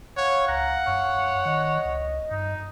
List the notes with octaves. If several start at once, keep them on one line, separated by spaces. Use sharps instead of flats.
C#5 F5 F#5
C#2 F#5 A#5
F#2 C#5
D#3 D#5
C#2
G2 D#4